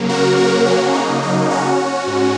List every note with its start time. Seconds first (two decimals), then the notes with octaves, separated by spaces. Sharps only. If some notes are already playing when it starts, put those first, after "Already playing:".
Already playing: C#3 F#3 A#3
0.09 F#4 A#4
0.37 F#4 A#4
0.66 C#4 F#4
0.94 D#4
1.22 D#4
1.51 C#4 F#4
2.07 G#2